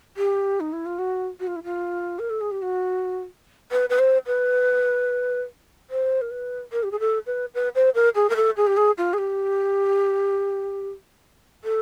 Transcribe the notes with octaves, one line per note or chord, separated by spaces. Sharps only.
G4
D#4
E4
F4
F#4
F#4
F4
E4
F4
A#4
A4
G#4
G4
F#4
B4
B4
C5
B4
C5
A#4
B4
A#4
G4
G#4
A4
B4
B4
C5
A#4
G#4
A#4
A4
G#4
G4
G#4
F4
G#4
G4
A4